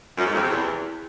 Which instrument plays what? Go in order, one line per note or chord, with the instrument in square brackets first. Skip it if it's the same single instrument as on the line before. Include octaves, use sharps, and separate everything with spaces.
[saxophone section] F#2
G#2
F2
C3
E2